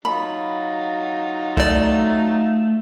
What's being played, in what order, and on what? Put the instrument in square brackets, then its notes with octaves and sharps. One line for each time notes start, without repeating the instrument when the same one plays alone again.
[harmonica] F#3 D#4 F4 [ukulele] B5
[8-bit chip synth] C2 D5 [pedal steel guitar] A3